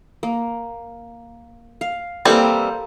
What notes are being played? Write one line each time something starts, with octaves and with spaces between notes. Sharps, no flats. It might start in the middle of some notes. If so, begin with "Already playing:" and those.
A#3
F5
E3 G3 A#3 C4 G4 A4